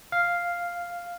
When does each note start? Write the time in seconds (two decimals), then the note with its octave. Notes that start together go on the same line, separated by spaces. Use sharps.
0.12 F5